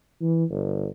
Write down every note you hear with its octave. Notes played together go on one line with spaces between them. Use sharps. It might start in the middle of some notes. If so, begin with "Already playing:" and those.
E3
G1